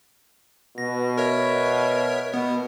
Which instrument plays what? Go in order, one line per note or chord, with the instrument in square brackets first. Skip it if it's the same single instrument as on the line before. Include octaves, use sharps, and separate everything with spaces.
[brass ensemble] B2 [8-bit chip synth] A#6
[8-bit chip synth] A#4 C#5 E5
[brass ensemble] B2 [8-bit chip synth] B3